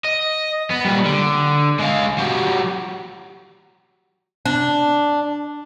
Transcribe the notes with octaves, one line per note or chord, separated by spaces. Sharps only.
D#5
B3
A#2 G3
D3
G#3 F5
F#3 G4
D4